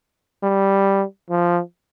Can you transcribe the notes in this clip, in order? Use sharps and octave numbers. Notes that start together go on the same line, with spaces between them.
G3
F3